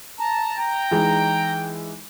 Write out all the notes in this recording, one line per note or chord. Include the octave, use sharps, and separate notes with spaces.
A5 A#5
G5 A#5
E3 G#3 D#4